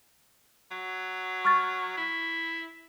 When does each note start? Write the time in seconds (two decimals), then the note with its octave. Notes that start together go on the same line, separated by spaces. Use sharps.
0.71 F#3
1.45 C#6 F6 A6
1.97 E4